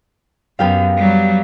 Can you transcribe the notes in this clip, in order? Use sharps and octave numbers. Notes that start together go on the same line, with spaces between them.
F#2 B3 G4 F5
F#3 G3